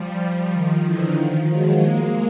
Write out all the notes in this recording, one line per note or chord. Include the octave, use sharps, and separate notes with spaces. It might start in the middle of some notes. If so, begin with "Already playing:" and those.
Already playing: F3 G3
F3 G3
D#3 F3
D3 E3
D#3 F3
F#3 G#3
G#3 A#3